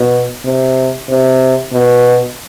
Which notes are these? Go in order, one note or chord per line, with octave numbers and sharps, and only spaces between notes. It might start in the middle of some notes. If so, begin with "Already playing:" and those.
Already playing: B2
C3
C3
B2